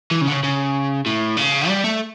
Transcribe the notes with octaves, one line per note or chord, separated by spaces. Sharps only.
E3
C#3
D3
C#3
C#3
A2
C#3
G3
A3